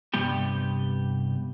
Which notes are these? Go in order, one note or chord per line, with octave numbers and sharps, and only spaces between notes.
G2 C3 G3 B3 G4